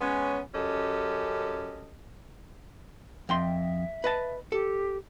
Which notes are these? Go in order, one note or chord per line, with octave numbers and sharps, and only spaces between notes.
G#3 B3 C#4
F#2 C#4 G4 A4 D#5
F2 E5 G5 C6
B4 D#5 A5
G4 A4